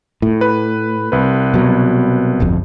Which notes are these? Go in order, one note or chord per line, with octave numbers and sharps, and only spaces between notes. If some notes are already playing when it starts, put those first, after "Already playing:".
A2
B4
C2 B4
B2 F#3
D1 G1 F2